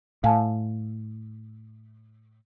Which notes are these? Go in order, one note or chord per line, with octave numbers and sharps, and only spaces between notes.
A2 F5 G#5 A5